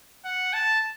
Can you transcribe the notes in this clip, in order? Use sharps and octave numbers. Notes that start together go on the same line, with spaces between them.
F#5
A5